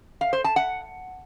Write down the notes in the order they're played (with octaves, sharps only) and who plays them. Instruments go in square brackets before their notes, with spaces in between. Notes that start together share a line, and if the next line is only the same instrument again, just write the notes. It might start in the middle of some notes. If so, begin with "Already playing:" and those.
[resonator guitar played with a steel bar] F5
C5
A5
F#5